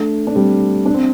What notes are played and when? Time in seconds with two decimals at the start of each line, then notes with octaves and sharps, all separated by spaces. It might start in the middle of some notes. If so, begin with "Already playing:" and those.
Already playing: A3 D4
0.27 D4
0.35 G3 C4
0.86 D4
0.94 C4